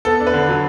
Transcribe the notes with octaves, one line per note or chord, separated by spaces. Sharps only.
B3 A4
D4
B4
D3
F#3